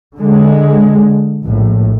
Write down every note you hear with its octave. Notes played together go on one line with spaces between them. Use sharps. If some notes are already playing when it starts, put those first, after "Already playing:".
D3 G#3
A#1 A2